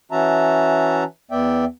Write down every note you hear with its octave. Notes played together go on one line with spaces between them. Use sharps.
E3 C#4 F#4 E5 A5 A#5
E2 B3 D5 E5 G5